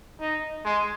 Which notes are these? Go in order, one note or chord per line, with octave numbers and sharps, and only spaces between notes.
D#4
G#3